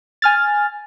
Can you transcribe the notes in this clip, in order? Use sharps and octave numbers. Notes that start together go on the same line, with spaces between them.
G#5 F6 A6